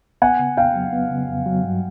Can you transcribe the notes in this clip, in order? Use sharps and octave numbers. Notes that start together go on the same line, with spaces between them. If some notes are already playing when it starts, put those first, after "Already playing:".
B3 F#5 G#5
C#3
F2 F5 G5
F#3
B3
C#3
F2
F#3
G2